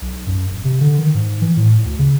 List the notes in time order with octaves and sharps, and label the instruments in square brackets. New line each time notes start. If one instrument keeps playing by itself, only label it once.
[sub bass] B1
F#2
D1
C3
D3
D#3
G#2
E3
A2
D2
C#3